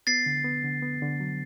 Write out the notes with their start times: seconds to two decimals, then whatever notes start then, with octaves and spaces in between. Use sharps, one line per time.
0.07 B3 A6 C7
0.26 D3
0.44 B3
0.64 D3
0.82 B3
1.02 D3
1.20 F#3